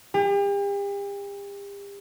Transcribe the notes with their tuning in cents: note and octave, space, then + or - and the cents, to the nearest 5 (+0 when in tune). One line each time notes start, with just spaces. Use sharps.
G4 +40